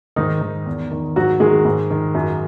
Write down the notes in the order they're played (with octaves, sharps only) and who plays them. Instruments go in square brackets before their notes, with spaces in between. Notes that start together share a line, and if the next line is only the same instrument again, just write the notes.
[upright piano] G#2 D#3 D#4
D#3
E2
D#3
G#2 F#3 F#4
D#3 G#3 G#4
G#2
D#3
F#2